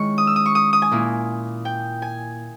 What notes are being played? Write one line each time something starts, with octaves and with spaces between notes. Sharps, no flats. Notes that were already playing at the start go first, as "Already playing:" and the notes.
Already playing: D#3 G#3 C#4 E4 C#6
D#6
E6
D#6
C#6
D#6
D#6
G#5
A#2 A#3 E4
G5
G#5